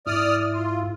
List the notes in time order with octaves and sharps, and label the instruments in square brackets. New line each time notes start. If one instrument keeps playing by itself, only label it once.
[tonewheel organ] G#2 E4 [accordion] D5 D#6 F6
[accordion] F4